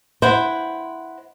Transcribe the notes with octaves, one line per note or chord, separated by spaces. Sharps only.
E4 C5 F#5 G5